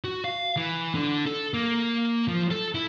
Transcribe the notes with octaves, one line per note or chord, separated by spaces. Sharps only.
F#4
F5
E3
D3
A4
A#3
F3
A4
E4